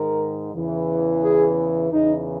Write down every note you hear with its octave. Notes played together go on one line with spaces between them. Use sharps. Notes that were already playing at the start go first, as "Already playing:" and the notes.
Already playing: G#2 D#3 A#4
E2 C#3 E3
G#4
E2 C#3 E3 D#4